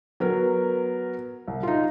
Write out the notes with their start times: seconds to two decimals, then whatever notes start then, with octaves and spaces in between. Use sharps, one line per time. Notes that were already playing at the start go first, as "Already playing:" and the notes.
0.20 F#3 B3 A#4
1.48 C2
1.63 D#4 F4